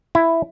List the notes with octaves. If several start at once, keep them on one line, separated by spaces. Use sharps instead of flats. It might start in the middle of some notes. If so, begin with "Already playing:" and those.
E4